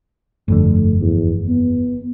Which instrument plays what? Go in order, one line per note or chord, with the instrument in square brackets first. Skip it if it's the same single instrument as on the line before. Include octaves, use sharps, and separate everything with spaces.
[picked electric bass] G1 F2 D3 [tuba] A3
[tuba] E2
B3